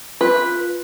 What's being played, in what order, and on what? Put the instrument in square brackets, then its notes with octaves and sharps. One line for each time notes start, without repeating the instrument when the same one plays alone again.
[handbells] F4 [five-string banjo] B4